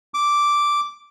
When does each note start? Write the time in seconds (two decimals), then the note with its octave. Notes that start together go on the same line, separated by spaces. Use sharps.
0.14 D6